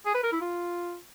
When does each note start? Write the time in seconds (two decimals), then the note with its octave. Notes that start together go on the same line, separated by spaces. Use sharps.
0.06 G#4
0.14 B4
0.23 A#4
0.32 E4
0.41 F4